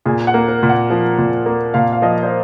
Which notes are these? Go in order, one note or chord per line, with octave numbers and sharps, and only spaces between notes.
A#2 G#4
F#5
A#3
A#4
A#2
F#5
F3
A#2
A#3
A#2 F5
F5
F3 D#5
C5